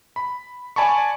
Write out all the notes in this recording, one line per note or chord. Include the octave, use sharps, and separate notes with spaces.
B5
D5 G#5 A5 B5 C#6